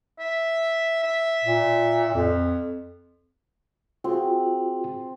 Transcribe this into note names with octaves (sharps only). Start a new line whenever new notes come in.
E5
E5
A#2
F2
C4 F4 F#4 G#4